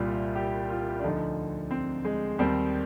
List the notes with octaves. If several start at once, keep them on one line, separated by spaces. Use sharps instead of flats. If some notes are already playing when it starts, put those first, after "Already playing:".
Already playing: C2 A#2 G3 F4
G4
F4
D4
D2 D3 F3 D#4
C4
G#3
D#2 D#3 G3 C4